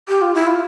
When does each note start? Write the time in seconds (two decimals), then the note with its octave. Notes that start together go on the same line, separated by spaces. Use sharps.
0.08 G4
0.21 F4
0.34 E4
0.47 F4